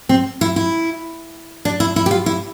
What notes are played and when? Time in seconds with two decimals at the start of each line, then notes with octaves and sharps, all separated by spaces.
0.09 C4
0.41 E4
0.56 E4
1.65 D4
1.80 E4
1.96 E4
2.06 G4
2.11 F4
2.26 E4